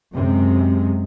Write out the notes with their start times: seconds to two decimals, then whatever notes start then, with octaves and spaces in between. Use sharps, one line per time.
0.15 F#2 C3 G#3